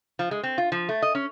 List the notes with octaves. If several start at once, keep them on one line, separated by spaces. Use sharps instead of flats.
F3
G#3
C4
F4
F3
A3
D#5
C#4